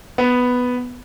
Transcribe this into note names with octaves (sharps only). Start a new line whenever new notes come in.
B3